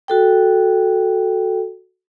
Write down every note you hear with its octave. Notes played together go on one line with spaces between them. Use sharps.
F#4 A4 G5